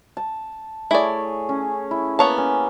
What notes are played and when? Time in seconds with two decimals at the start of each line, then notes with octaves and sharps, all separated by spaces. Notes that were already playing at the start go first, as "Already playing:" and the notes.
0.17 A5
0.91 A3 E4 G#4 C#5 D5
1.49 C#4
1.91 E4
2.19 A#3 B3 C#5 A5
2.38 C#4